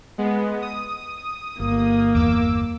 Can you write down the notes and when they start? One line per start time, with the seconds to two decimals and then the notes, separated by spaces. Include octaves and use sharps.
0.18 G#3 B3
0.62 D#6
1.60 G1 A#3
2.14 E2 D6 E6